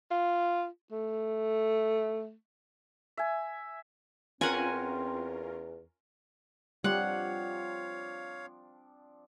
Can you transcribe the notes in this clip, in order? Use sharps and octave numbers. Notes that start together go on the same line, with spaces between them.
F4
A3
E5 G#5
E2 C4 C#4 F4 A#4 F#5 G#5
F3 G3 C4 D4 C#5 F5 F#5